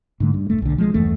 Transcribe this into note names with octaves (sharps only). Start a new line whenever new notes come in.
G#2 D3 A3
G2
E1 A3
B1 D3
F3 G#3
E2 G2 E3 A3